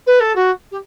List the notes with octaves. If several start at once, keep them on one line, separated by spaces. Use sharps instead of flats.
B4
A4
F#4
G4